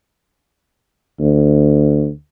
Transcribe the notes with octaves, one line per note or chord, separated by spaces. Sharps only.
D2